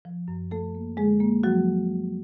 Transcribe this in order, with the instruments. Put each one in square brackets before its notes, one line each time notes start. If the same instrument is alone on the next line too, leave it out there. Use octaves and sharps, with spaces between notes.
[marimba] F3
F#2
F3 A3 A4
A#3
D3 G#3 G#4
A#3
F3 F#3 F#4